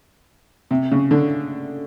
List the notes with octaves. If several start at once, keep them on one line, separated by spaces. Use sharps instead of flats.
C3
C#3
D3